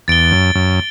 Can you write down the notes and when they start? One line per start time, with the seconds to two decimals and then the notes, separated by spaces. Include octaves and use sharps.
0.08 E2 A6 D7 G7
0.32 F#2
0.55 F#2